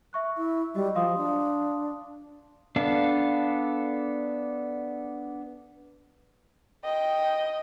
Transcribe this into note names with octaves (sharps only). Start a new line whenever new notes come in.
E5 C#6 F#6
E4
G3 F#4 D#5
F3 F5 C6 D#6
D4
B3 D4 A4 F5
D#5 G5